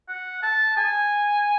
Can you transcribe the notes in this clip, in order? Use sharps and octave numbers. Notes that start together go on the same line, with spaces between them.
F#5
A5
G#5